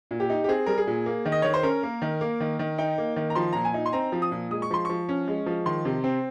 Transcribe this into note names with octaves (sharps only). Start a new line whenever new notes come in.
A#2
G4
D#4
G4
C4 G#4
G3 A#4
G#4
A#2
A#3
D#3
D#5
D#3 C#5
C5
C#4 A#4
A#3
D#3
A#3
D#3
D#3
D#4 G5
A#3
D#3
A#5
F3 C6
A#2 A#5
G#5
D#4
C6
C4 A#5
F3
D#6
A#2
G#3 D#6
C#6
F3 C6
F3 C#6
C#4
G#3
F3
D#3 C6
C3
C4